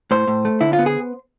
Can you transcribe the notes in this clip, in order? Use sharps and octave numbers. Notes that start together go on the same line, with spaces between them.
A2 C5
A2
A3
D3 E4
F4
B3
G#4